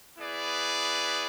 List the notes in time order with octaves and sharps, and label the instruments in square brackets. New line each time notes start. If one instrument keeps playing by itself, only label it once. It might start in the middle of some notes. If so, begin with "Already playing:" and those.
[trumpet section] B3 E4 G#4 B4 D5